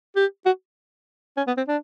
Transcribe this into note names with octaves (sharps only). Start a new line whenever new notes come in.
G4
F#4
C#4
B3
C4
D4